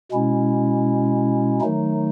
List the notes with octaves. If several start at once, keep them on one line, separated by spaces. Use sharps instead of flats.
B2 G#3 C#4 E4
D#3 F#3 A3 D#4